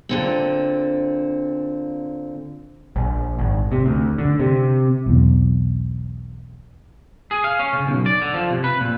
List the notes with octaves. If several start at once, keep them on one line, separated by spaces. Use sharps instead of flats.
A#2 D3 C4
A#1
G#1
C3
D2
D3
C3
B1 E2
G#4
F5
C#4
C#3
B1
D5
D3
F3
C3
B4
A#2